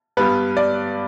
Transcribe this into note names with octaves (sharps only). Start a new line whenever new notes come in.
G2 G3 B3 B4
D5